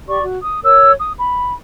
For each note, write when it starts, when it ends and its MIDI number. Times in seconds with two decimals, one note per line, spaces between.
0.08 0.22 67
0.08 0.22 74
0.08 0.22 85
0.23 0.38 66
0.42 0.59 87
0.63 0.92 70
0.63 0.92 73
0.63 0.92 88
1.00 1.13 87
1.17 1.52 83